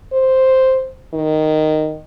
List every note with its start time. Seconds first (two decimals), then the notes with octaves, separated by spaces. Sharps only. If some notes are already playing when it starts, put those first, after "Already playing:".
0.13 C5
1.13 D#3